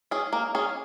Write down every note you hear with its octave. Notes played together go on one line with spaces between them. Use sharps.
C#4 G#4
A#3
C#4 G#4